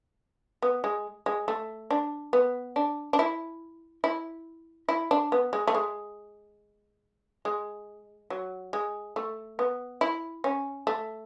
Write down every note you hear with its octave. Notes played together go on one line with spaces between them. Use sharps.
B3
G#3
G#3
A3
D4
B3
D4
D4
E4
E4
E4
D4
B3
G#3
A3
G#3
G#3
F#3
G#3
A3
B3
E4
C#4
A3